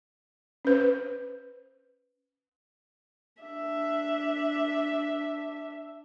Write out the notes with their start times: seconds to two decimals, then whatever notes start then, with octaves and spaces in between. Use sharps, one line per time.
0.65 C#4 B4 C5
3.42 D4 E5